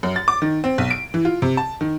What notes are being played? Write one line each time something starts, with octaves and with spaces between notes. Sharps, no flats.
F#2
A6
D6
D#3
C4
B1
D7
E3
F4
C3
A5
D#3